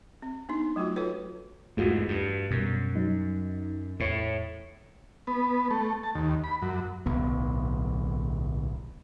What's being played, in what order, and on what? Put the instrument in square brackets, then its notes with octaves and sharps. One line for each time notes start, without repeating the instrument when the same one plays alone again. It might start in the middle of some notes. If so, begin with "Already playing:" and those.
[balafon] C4
B3 D4 D#4
F#3 A3 F4 F#4
F4 F#4 A4 B4 C#5
[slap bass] E2 G#2 [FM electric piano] A3 F4 F#4
[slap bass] G2
[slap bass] F#2 [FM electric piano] B2 G3
[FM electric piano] F#3 D#4
[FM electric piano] E2 C#5 C#7 [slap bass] A2
[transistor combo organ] B3
A3
A5
D#2
B5
F#2
[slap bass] D1 B1 B3